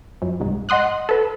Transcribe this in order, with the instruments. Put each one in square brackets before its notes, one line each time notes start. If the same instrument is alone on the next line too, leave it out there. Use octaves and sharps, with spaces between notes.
[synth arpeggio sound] F#2
C2 G#2
D#5 F#5 C6 D#6 F#6
A4 B4